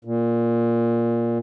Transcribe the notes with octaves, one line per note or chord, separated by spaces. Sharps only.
A#2